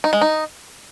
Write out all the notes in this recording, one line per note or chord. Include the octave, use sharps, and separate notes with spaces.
D#4
G#3
D#4